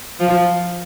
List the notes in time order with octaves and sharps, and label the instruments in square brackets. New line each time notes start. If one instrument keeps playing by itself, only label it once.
[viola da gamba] F3